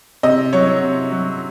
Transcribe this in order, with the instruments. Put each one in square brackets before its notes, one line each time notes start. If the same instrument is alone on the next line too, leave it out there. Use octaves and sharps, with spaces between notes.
[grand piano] C3 D#5
F#3 C#5
C3
F#3